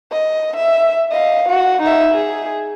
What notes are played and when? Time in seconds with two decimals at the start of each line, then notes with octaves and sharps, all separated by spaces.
0.12 D#5
0.56 E5
1.12 D#5 F5
1.49 F#4
1.82 D#4 E5
2.14 G#4